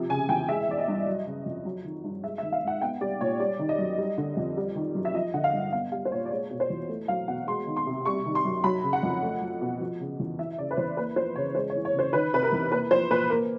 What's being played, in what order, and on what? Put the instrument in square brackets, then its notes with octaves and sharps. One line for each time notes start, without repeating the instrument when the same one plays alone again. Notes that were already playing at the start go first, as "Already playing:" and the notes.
Already playing: [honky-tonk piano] C3 F3
C#3 G#5
E2 G5
G#3 E5
E3 D5
D#5
G2
F#3
C#3
F2
F#3
D#3
G2
G#3 E5
E5
D#3
F5
G#2 F#5
B3 G5
G3 D5
A#2 C#5
G3 D5
D#3
D#5
F#2
G3
D3
F2
G3
D#3
F#2
E5
F3 D#5
D3 F#5
F5
G2
B3 F5
G3 F5
C5
A#2 C#5
D5
G#3 C#5
B2
C5
E2
A3
F#3 F5
B2 F#5
G#3 C6
D#3
C6
C3
G3 C#6
D#3
C6
F#2
F#3 B5
C#3
F#5
F2
A3
F#3
B2
F3
C#3
E2
E3 E5
C#3 D5
B4
E2 C5
A#3 B4
F3 C5
C#3 C#5
G#3 C5
C#5
E3
C#5
C#3 C5
D#3 B4
C3 B4
A#4
E2
A#3 B4
F3 C5
A#2 B4
A#3 A#4